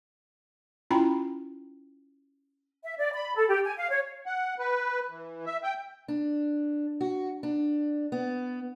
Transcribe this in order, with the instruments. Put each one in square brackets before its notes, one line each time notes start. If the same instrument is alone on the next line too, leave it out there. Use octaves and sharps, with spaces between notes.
[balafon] C#4 E4 F4 G5 A#5 B5
[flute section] E5
D5
B5
A4
G4
G#5
F5
C#5
[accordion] F#5
B4
E3
E5
G5
[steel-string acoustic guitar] D4
F#4
D4
B3